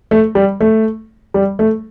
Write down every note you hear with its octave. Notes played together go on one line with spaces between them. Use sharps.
A3
G3
A3
G3
A3